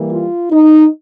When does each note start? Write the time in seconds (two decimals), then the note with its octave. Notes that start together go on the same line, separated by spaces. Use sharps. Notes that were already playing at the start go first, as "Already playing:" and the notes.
Already playing: E3 G3 A#3
0.12 F4
0.51 D#4